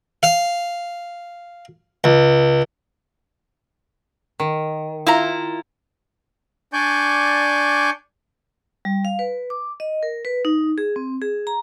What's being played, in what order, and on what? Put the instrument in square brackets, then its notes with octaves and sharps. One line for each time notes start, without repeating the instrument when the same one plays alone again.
[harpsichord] F5
C#2
[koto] D#3
[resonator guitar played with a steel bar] E4 F4 A#5
[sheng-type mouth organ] D4 D5 G#5 C#6 G6
[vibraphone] G3
F5
B4
D6
D#5
A#4
B4
D#4
G#4
C4
G#4
A#5